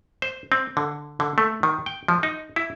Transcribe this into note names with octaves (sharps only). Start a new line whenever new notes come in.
C5
C4
D3
D3
A3
D#3
G5
F3
D#4
E4